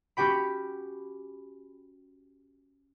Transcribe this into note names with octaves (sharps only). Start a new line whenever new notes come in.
C#4 F#4 G4 G5 B5